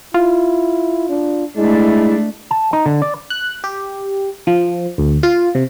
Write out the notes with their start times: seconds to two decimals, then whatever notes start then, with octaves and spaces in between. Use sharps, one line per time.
0.14 E4 F4
1.09 D4
1.56 G#3 A3 D4 E4
2.51 A5
2.73 D#4
2.86 D3
3.02 D5
3.30 F#6
3.64 G4
4.47 F3
4.98 D2
5.23 F4
5.55 C3